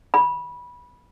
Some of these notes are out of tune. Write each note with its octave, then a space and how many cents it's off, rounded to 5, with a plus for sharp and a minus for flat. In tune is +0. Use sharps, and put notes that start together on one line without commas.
B5 -15